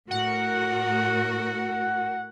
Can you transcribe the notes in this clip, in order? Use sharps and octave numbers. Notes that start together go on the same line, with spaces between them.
A2 F#4 A#4 F#5